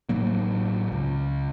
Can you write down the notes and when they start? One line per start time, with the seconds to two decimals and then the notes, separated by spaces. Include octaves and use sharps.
0.09 A1 A2 F#3 A#3
0.92 C#2